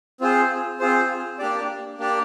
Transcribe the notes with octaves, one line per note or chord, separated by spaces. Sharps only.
C4 F4 G#4 C5
C4 F4 G#4 C5
A#3 D4 G4 D5
A#3 D4 G4 D5